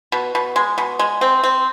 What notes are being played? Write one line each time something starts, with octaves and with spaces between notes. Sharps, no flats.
B2
B2
G#3
B2
G#3
C4
C4